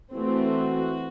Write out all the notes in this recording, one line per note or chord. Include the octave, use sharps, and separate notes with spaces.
E3 A3 C4 F#4